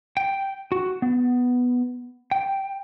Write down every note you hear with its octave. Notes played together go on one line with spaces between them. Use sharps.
G5
F#4
B3
G5